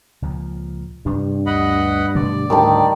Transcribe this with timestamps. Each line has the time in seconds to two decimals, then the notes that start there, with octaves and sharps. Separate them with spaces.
0.22 C#2 A#2 F3
1.06 G2 C3 G3 D4
1.46 D2 D#5 F#5 B5
2.15 B2 D3 A3 D5
2.50 D2 G#2 D#3 G3 A5